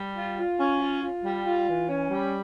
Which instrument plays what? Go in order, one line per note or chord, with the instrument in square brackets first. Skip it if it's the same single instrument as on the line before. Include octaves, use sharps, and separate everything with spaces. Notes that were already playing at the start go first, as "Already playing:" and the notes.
Already playing: [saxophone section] G3
F4
F4
C#4
F4
F4
G3
F4
E3
C#4
G3